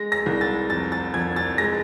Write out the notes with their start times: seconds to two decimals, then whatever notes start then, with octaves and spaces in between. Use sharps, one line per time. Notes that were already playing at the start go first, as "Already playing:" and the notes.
Already playing: G#3 A#6
0.12 A#6
0.26 C2
0.41 A6
0.70 F2 A6
0.92 A6
1.14 F2 G#6
1.36 A6
1.58 G#3 A#6